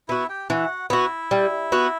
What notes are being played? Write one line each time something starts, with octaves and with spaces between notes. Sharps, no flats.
B3 E4 F#4 E5
G4 G5
E3 F#4 F#5
B3 E4 F#4 E5
G3
B3 F#4